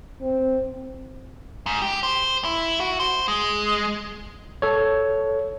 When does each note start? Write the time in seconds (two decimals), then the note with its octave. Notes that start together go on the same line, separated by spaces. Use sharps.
0.21 C4
1.66 G#2
1.82 G4
2.03 C5
2.45 E4
2.80 F#4
3.00 C5
3.28 G#3
4.62 A4 C#5